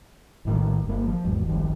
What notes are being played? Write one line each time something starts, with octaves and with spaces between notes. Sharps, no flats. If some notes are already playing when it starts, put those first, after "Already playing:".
A#1 A2 D#3
G1 A#3
F3
G#1 E2
G1 C2 D#3 F3